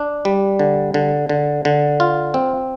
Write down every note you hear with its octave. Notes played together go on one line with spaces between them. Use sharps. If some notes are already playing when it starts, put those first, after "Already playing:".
Already playing: D4
G3
D3
D3
D3
D3
F4
C4